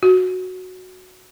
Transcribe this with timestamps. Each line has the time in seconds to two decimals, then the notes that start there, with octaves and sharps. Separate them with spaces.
0.03 F#4